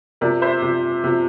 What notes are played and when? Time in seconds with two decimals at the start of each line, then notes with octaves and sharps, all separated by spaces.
0.21 C3 F3 A#4 D5
0.42 C5 E5
0.62 C3 F3
1.04 C3 F3